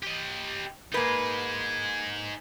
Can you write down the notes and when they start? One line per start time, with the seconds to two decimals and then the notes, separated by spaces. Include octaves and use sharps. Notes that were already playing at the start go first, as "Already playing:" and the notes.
0.03 G4 D#5
0.94 A#3 D#4 G#4 B4